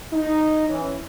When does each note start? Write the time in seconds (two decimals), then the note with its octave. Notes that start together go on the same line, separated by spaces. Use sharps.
0.13 D#4
0.69 E3 C#4